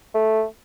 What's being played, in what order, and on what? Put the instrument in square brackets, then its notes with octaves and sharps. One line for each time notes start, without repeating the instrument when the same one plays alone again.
[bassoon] A3